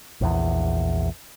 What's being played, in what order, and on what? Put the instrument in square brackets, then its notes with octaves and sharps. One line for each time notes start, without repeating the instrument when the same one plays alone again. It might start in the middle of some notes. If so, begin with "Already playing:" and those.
[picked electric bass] A#1 E2